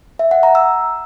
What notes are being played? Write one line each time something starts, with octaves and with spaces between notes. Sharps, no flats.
E5
F#5
A#5
E6